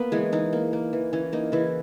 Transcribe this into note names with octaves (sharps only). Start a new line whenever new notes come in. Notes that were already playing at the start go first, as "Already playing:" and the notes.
Already playing: A#3 B3 B4
E3 G#3 G#4
E3 D#4
A#3
A#3
E3
E3 C#4
A#3 D#4
C#3 E3 E4